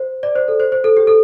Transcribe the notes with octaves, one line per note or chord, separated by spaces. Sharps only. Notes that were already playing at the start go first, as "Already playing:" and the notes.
Already playing: C5
D5
C5
A4
C5
C5
A4
G4
A4